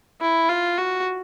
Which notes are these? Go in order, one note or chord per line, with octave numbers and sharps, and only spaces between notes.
E4
F4
F#4